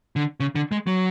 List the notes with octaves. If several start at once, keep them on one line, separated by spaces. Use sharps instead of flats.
D3
C#3
D3
G#3
F#3